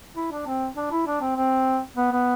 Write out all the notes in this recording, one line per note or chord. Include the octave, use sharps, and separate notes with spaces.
E4
D4
C4
D4
E4
D4
C4
C4
B3
B3